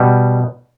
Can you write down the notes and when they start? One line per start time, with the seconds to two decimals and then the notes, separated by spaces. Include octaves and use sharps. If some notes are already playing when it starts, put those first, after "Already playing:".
Already playing: B2 G3